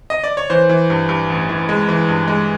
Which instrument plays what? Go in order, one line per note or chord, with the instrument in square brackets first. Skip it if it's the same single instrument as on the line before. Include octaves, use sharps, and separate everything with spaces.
[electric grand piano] D#5
D5
C#5
E3 C5
E3
G2
G2
A1
E3
G#3
E3
G2
G#3